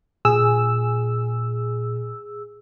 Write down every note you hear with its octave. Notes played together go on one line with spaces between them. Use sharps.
A#2 G#4 E6